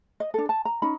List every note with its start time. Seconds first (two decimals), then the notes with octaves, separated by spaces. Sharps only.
0.20 D#5
0.34 D4 A4
0.49 A5
0.65 A#5
0.82 C#4 D#4 B5